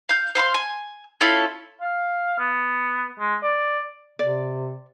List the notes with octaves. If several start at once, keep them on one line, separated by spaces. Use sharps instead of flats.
F5 G6
C5 F5 B5 C6
G#5
C#4 E4 F4 A4
F5
B3
G#3
D5
C3 D5